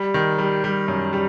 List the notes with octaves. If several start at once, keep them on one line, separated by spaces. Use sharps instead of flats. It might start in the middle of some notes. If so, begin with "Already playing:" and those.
Already playing: G3
D#3
G3
G3
F#2
G3